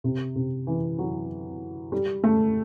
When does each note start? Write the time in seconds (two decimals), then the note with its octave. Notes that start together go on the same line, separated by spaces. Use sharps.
0.04 C3
0.35 C3
0.67 E3
0.98 F#3
1.92 G3
2.24 A3